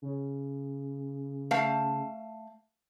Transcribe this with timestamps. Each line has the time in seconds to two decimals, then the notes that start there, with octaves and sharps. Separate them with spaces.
0.02 C#3
1.51 A3 F5 A5